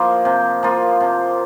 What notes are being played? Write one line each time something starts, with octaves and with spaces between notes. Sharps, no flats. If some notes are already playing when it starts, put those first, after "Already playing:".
Already playing: F3 A#3 F4
C3
F3 A#3 F4
C3